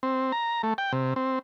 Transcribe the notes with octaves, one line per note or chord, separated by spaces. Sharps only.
C4
A#5
A3
G5
C3
C4